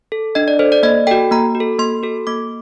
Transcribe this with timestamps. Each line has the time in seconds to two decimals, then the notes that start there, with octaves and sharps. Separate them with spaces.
0.12 A4
0.35 D4 D#5
0.48 D5
0.59 A4 C5
0.72 D5
0.83 A#3 D#5
1.07 F#4 A4 G5
1.31 A#3 A#5
1.55 F#4
1.60 A4
1.79 A#3 C6
2.03 F#4 A4
2.27 A#3 D6